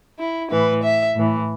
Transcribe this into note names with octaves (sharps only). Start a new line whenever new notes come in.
E4
A2 E3 B4
E5
A2 E3